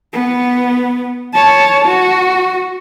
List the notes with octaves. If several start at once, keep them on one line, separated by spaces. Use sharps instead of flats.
B3
C#5 A5
F#4